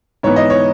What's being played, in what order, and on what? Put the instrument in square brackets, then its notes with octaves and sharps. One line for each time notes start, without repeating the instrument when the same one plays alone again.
[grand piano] G#2 E3 B3 C#5
D#5
C#5